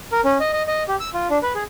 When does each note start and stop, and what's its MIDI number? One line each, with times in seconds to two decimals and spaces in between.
0.12 0.21 70
0.24 0.38 61
0.40 0.51 75
0.53 0.63 75
0.68 0.83 75
0.88 0.96 67
1.00 1.10 88
1.14 1.28 65
1.30 1.38 62
1.43 1.53 71
1.55 1.64 68